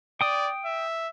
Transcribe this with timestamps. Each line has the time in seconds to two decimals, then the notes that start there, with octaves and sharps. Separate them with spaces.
0.21 D5 G5 D#6
0.65 E5